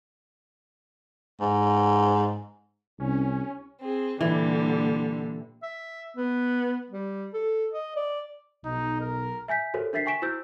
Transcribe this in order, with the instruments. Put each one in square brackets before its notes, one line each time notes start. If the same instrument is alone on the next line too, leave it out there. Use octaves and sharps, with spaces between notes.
[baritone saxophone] G#2
[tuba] C2 [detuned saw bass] C#4
[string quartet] C4 G#4
[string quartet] A#2 D3 G3 [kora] E3
[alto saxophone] E5
B3
G3
A4
D#5
D5
[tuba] B1 [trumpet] D#4
[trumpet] A#4
[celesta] E5 G#5 G6 B6
F#4 G4 A4 A#4 C5 C#5
D4 A#4 E5 A6 B6 C7
G5 G#5 C#6 B6 D7 E7
E4 F#4 C5 E6 G6